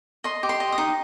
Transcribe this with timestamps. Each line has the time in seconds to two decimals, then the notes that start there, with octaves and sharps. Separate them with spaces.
0.24 D#5 C6
0.43 G4
0.49 C6
0.60 D#5
0.72 D#6
0.78 D#4